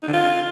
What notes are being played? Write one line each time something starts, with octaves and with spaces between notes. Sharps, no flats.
D#4
D3
F4